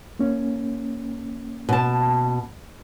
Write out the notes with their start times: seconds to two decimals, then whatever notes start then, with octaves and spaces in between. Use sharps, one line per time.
0.19 A#3 C#4
1.69 B2 A5